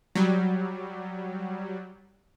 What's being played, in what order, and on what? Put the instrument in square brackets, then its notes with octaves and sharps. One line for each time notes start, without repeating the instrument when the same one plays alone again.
[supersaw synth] F#3 G3